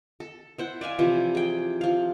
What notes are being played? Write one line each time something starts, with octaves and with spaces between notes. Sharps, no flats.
A4
E4 C5 F#5
D5 E5 F5 G#5
C3 E3 F3
G#4 G5
F3 F5